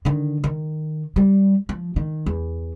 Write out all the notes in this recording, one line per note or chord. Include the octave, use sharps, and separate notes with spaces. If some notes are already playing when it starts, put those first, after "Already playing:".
D3 D#3
D#3
G3
F3
D#3
E2